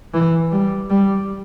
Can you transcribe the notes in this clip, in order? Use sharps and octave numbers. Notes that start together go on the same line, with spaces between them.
E3
G3
G3